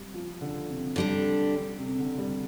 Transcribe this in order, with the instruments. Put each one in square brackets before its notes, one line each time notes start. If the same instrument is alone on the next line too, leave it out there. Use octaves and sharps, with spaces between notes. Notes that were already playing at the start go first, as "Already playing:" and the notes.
Already playing: [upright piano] G3 C4
F3
D3
C3
[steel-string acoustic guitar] D3 G3 D4
[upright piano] C3
D3
G3